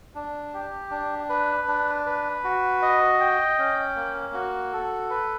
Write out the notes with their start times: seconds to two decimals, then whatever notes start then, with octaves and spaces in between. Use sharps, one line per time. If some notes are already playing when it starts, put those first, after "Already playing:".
0.15 D4
0.54 G4
0.91 D4
1.29 B4
1.68 D4
2.06 B4
2.44 F#4
2.82 D#5
3.20 G5
3.59 C#4
3.96 A#3
4.34 F#4
4.73 A4
5.10 B4